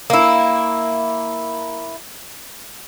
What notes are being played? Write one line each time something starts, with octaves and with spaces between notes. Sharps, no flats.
A#3 E4